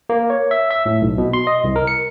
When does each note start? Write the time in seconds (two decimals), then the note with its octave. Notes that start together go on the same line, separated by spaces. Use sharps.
0.09 A#3
0.30 C#5
0.51 E5
0.71 E5
0.86 A2
1.02 B1
1.18 B2
1.33 C6
1.47 D#5
1.64 C2
1.76 A#4
1.87 C#7